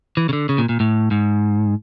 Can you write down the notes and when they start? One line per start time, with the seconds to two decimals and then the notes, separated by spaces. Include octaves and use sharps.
0.17 E3
0.29 C#3
0.33 D3
0.49 C#3
0.58 A#2
0.69 A#2
0.80 A2
1.11 G#2